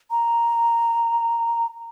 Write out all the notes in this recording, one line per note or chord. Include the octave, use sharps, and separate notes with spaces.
A#5